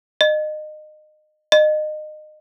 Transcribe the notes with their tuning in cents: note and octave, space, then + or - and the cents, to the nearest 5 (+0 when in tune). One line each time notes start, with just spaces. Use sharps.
D#5 -25
D#5 -25